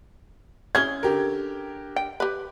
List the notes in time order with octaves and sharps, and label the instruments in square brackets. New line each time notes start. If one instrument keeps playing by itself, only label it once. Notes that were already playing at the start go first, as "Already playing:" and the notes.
[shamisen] C#4 E4 G#4 [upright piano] G#6 G7
[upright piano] D3 G4 A#4
[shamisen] G5
G4 B4